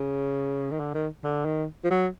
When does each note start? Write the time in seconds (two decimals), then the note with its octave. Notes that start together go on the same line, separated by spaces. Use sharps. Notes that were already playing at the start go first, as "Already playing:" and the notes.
Already playing: C#3
0.71 D#3
0.80 D3
0.94 D#3
1.24 D3
1.45 D#3
1.84 F3
1.90 F#3